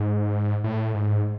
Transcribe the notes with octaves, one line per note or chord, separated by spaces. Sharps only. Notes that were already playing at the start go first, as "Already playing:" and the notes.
Already playing: G#2
A2
G#2